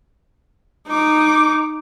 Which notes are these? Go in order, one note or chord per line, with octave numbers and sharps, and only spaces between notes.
D#4 D6